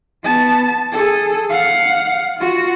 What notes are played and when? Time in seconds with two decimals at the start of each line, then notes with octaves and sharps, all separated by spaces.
0.24 B3 A5
0.92 G#4 A4
1.50 F5 F#5
2.37 F4 F#4